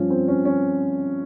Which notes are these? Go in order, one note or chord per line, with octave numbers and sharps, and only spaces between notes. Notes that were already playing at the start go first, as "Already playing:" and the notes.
Already playing: G2 F3 C#4 F4
C4
C#4
C#4